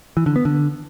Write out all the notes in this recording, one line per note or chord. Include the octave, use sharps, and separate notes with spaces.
E3
D3
B3
D3